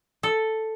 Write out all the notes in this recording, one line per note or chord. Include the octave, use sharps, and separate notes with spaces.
A4